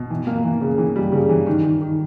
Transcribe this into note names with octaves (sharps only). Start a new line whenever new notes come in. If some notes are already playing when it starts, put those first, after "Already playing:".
Already playing: B2
E3
A#3
E3
C#3
E3
G3
C#3
E3
D#3
D#3
D#3